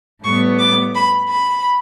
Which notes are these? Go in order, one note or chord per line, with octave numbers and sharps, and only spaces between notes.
A2 G3 B3 C#6
D6
B5
B5